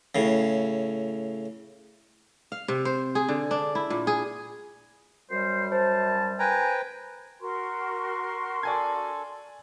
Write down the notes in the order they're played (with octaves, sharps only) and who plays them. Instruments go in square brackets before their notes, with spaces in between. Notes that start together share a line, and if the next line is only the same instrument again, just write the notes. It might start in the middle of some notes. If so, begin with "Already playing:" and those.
[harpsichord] A2 C#3
[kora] F5
C3
C5
G#4
D3
D4
E4
A#2
G#4
[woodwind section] F#2 G3 [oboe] C5
[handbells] C5 [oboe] A5
[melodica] B4 G5 A#5 [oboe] G#5
[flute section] F#4 A#4 C#6 [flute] C6
[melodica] D4 A4 [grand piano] D5 G#5 G#6